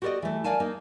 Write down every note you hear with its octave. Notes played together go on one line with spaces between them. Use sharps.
F#4 G4 A4 A#4 D5 D#5
E3 A3
A#4 C5 D5 F5 G#5 A5
A#3 D#4